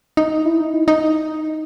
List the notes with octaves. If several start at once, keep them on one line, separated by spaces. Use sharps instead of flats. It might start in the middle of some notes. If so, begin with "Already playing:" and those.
D#4
E4
D#4
E4
D#4